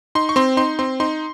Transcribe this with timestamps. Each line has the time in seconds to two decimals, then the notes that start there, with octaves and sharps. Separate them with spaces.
0.15 D#4 C6
0.29 C#6
0.36 C4 C6
0.57 D#4 C6
0.79 C4 C6
1.00 D#4 C6